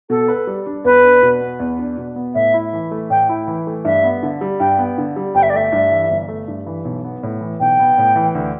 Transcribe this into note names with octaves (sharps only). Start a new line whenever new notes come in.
B2 A4
B4
G3
D4
E2 B4
D4
B2
B3
E2
D4
B2
B3
A2 E5
E4
E3
A3
A2 G5
E4
E3
A3
G2 E5
B3
D3
G3
G2 G5
B3
D3
G3
G1 G5
E5
D5
A3 E5
G2
E3
G1
A3
G2
E3
B1
B3
A2
E3
B1 G5
B3
A2
E3
D2